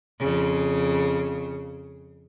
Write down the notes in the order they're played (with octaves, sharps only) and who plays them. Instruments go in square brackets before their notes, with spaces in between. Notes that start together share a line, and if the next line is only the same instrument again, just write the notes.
[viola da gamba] F2 C#3